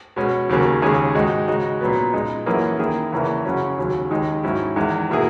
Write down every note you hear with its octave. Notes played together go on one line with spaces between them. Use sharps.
B2 G#3 C#4
D#2 C#3 F#3 A#3
D#2 C#3 G#3 C#4 G#4
G#2 D#3 G#3 D#4 F#4
C#3 G#3 D#4 F#4
A#2 F#3 B3
A#2 G#3 D#4
F#2 E3 A#3 C#4 G#4
D#3 A#3 E4 G#4
E2 C#3 E3 A#3
F#2 C#3 F#3 C#4
D#2 C#3 F#3
D#2 D#3 G#3 D#4
G#2 F#3 C#4 E4
E2 D#3 G#3
B2 A#3 E4 G#4